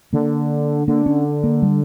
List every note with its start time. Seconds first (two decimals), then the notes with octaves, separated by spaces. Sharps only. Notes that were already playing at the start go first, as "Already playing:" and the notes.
0.13 D3 A#3
0.87 D3 A#3
1.06 C#4
1.44 A#3
1.62 G3